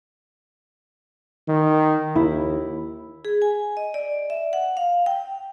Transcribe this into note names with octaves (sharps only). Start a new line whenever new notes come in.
D#3
D#2 E4
G#4
G#5
D#5
D5
E5
F#5
F5
G5